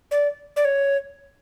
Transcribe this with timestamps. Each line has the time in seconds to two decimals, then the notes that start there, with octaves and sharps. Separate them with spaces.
0.11 D5
0.56 D5
0.65 C#5